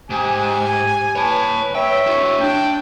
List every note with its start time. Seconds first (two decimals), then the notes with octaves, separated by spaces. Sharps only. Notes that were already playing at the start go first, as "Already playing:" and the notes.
0.10 G#2 G4 G#5
1.15 B4 C#5 A5
1.75 C#5 E5 G5
2.07 E4 F#4
2.40 D4 G5